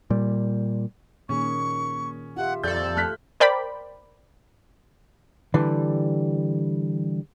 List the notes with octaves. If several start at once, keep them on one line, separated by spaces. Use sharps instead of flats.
A#2 G3
A#2 D#3 C#4 G#4 C#6
F4 G4 E5 F#5
F2 A4 D5 G6
A3 F6 F#6 B6
A#4 C5 D5 G5 B5
D3 E3 G3